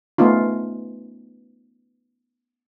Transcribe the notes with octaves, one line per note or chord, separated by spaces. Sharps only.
A3 B3 C#4 D#4 F4